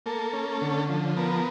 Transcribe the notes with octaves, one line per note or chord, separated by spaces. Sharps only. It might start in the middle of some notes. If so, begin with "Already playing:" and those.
A#3 A4
C#4
D3
F3
B3 A#4